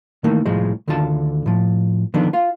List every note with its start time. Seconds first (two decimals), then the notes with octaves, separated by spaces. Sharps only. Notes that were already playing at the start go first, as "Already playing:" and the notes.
0.24 D#3 E3 A3 A#3
0.46 C2 A2 F3 G#3
0.88 D2 D3 D#3 F4 A5
1.46 A2 F3
2.14 D3 D#3 F3 B3 D4
2.33 F4 F5